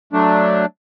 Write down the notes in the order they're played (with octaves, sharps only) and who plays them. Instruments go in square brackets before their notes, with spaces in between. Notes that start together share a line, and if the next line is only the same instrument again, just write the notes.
[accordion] F#3 A3 D4